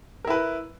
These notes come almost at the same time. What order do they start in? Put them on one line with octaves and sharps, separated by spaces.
A#4 E4 B4